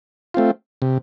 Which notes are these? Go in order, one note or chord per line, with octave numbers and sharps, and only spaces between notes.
A3 C4 F4
C3